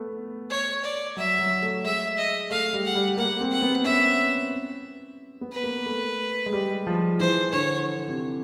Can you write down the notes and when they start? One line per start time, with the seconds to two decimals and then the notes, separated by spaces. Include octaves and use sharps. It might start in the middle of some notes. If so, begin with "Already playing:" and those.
Already playing: A3 B3
0.50 C#5
0.84 D5
1.17 F#3 E5
1.39 F#3
1.62 A3
1.84 G#3 E5
2.18 D#5
2.51 A3 F5
2.73 G3
2.85 F#5
2.95 G3
3.18 A#3 F#5
3.41 C4
3.52 F#5
3.62 B3
3.84 C#4 E5
5.41 B3
5.52 B4
5.63 A#3
5.86 A3
6.46 G#3
6.53 G3
6.87 F3
7.20 E3 C5
7.53 D3 C#5
8.08 C3